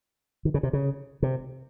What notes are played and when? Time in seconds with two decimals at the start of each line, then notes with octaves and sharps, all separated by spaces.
0.45 D#3
0.54 C#3
0.63 C3
0.73 C#3
1.22 C3